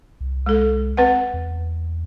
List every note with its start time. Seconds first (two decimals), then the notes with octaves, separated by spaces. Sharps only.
0.21 C2
0.46 G#3 A4
0.97 C4 B4 F#5
1.34 E2